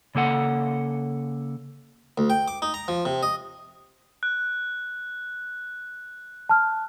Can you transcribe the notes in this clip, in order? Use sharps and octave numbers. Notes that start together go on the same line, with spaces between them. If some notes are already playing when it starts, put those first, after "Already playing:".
C#3 A#3 A4 F#5
D2
G5
D6
D#4
A#5
F3
C3
D#5
F#6
A5 F6